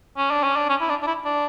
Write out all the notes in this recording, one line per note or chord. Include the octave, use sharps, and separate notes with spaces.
C#4
D4
C#4
D4
C#4
E4
D4
D4
E4
D4